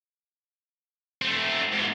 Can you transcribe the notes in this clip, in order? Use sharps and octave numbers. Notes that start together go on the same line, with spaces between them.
A3 C4
G#2 B3